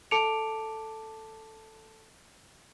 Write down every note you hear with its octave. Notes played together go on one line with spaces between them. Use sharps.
A4 A5 D6 C#7 D7 F7